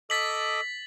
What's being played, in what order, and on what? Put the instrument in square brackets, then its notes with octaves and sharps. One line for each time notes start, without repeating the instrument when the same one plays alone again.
[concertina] A4 D#5 D6 [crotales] A6 B6 F#7